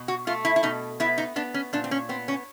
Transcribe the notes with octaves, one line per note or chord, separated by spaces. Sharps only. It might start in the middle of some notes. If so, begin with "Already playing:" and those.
Already playing: B2
F#4
A3 F4
E4
E4
B2 D#4
B3 E4
D#4
B3 D4
C#4
A#2 D4
C4
C#4
B3 C4
C#4